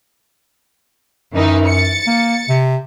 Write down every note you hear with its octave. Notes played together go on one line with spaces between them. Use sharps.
F#2 D#3 E3 D#4
A6 C#7
A#3
C3